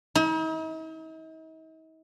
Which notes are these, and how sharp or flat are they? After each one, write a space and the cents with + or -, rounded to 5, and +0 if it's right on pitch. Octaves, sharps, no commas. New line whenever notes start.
D#4 +45